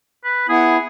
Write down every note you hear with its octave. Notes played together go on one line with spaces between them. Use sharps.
B4
B3 E4 G#4